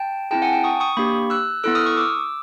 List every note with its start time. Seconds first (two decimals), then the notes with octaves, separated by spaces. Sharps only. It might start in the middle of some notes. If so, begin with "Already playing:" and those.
Already playing: G5 A5
0.31 C4 E4 G#4 G5 A5
0.42 F#5 G#5
0.53 G5 A5
0.64 C#6 D#6
0.80 C#6 D#6
0.97 A#3 D4 G4 B5 C#6
1.30 E6 F#6
1.64 B3 E4 A4 E6 F#6
1.75 D#6 F6
1.86 C#6 D#6
1.97 D6 E6